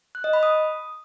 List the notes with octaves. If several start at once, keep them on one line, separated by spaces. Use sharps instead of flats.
F#6
D#5
B5
D#6